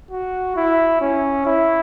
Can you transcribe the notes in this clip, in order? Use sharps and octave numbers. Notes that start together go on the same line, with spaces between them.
F#4
E4
C#4
E4